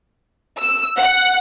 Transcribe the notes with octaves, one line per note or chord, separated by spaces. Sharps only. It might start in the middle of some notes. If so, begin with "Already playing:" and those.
E6
F#5